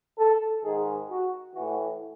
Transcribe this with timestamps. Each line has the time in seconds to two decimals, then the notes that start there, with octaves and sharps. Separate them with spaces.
0.18 A4
0.63 G#2 D#3 G#4
1.10 F#4
1.54 A2 E3 F#4